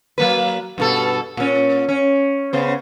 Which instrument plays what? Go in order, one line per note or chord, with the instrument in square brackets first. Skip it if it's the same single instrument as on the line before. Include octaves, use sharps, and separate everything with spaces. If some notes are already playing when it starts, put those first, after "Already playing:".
[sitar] F#3 A#3 B4
G2 B2 A4
A#2 C#4
C#4
C#3 B3 C5